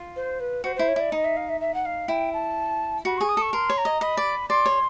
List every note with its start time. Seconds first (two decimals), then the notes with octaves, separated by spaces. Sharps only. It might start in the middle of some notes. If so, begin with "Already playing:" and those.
Already playing: F4
0.16 C5
0.40 B4
0.64 F#4 C5
0.75 E4 C5
0.88 C#5
0.96 E4 D5
1.12 D#4 D#5
1.24 E5
1.36 F5
1.49 E5
1.60 E5
1.74 F#5
1.85 F5
2.08 E4 G5
2.33 A5
3.05 F#4 B5
3.17 G#4 C#6
3.28 D#6
3.37 A4 C#6
3.53 A#4 C6
3.70 C#5
3.77 A#5
3.85 D#5
4.01 D#5 B5
4.17 D5
4.49 D5 C6
4.66 C#5